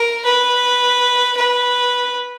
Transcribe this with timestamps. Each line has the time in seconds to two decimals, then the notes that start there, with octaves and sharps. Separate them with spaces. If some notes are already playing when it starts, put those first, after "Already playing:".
Already playing: A#4
0.25 B4
1.37 B4